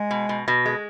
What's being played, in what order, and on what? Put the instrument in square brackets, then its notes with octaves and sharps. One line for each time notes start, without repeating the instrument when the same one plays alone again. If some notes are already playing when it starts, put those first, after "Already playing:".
Already playing: [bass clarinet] G#3
[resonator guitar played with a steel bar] B2
B2
B2
G#3